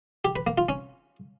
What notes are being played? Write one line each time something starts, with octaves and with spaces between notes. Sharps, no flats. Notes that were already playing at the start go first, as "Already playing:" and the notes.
G4
B4
A#3
F4
C#4